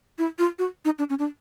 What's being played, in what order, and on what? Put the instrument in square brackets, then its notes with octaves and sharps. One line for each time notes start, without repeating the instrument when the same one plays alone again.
[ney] E4
F4
F#4
D#4
D4
C#4
D4